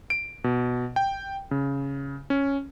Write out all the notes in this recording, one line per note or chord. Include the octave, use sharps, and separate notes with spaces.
D7
B2
G5
C#3
C#4